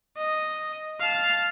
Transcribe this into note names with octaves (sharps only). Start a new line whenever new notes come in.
D#5
F5 A5